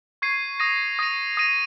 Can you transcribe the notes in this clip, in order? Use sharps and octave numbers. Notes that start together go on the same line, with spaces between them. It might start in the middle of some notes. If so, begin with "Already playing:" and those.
C#6 G#6 C7 D#7
D#6 A#6 D#7
D#6 A#6 D#7
D#6 A#6 D#7